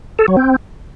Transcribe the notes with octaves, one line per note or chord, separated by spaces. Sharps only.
A4
F#3
C4